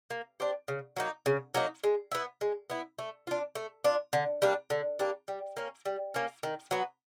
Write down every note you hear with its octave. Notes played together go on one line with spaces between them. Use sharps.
A#3
D4 G4 C5
C#3
F#3 A#3 D#4
C#3
F#3 A#3 D#4
G#3
B3 E4
G#3
B3 E4
A3
D4 F4
A3
D4 F4
D3
G3 A#3 D4
D3
G3 A#3 D4
G3
A#3 C#4
G3
A#3 C#4
D#3
F#3 B3